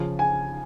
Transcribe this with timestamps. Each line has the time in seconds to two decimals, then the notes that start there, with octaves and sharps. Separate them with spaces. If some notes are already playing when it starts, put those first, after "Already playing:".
Already playing: C#3 F3
0.19 G#5